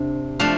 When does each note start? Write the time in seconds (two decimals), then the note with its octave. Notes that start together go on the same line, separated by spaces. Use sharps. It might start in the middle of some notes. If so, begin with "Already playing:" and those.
Already playing: C3 D4
0.39 F3 A3 D4 F5